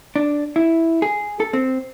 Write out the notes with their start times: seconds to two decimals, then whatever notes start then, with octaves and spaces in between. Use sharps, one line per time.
0.16 D4
0.56 E4
1.02 G#4
1.40 A4
1.53 C4